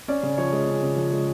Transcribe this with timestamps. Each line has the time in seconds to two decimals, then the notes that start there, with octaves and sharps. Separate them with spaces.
0.08 C#4 D5
0.23 C#3
0.38 F3 C#5
0.52 G#3
0.67 C#4
0.82 C#3
0.96 F3
1.12 G#3